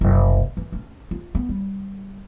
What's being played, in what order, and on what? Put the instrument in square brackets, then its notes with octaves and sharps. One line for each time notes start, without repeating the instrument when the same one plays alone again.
[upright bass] F#1 C2
E3
C#4 D4
F4
B3
G3